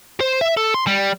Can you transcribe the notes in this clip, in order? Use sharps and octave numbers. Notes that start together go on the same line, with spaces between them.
C5
E5
A4
C6
G3